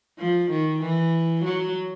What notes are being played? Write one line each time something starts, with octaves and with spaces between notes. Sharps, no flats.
F3
D#3
E3
F#3